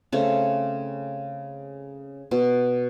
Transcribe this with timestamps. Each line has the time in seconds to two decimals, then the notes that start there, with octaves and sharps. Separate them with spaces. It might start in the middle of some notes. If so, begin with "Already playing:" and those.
0.12 C#3 A3 C4
2.31 B2